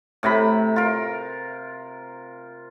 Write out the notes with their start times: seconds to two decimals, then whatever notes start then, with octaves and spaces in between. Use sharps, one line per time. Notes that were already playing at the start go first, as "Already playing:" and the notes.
0.23 A2 C3 A#5 B5
0.76 F4 A#4